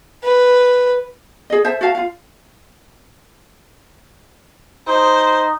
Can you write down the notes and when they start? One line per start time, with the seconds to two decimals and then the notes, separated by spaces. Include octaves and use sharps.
0.23 B4
1.50 G#4 D#5
1.65 C5 E5 A5
1.81 F#4 E5 F5 A5
1.95 F4 F5
4.88 D#4 C5